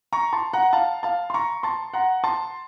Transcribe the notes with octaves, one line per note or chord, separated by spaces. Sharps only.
A#5 C#6
A5 C6
F#5 A#5
F5 A5
F5 A5
C6
A#5 C#6
A5 C6
F#5 A#5
A5 C6